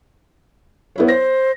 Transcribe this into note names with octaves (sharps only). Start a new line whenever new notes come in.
B3 E4 C#5
C5 A#6